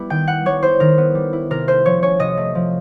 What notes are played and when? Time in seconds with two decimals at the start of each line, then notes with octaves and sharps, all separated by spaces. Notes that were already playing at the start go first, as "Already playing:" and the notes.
Already playing: G3 B3 E4
0.10 D#3 G5
0.28 B3 F#5
0.45 G3 C#5
0.63 E4 C5
0.80 D#3 A#4
0.98 B3
1.15 G3
1.33 E4
1.50 C3 A#4
1.68 A3 C5
1.85 F3 C#5
2.02 C#4 C#5
2.19 C3 D#5
2.37 A3
2.55 F3